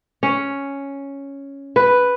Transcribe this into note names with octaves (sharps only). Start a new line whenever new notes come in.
C#4
B4